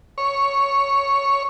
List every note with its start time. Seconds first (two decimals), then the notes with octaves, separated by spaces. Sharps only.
0.18 C#5